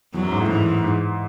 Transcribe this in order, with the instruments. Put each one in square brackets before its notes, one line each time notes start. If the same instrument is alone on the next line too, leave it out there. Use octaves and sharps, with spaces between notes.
[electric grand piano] E2 [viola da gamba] F#3
[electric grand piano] F#2
G#2
A2
[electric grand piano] G#2 [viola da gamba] E3
[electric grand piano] G#2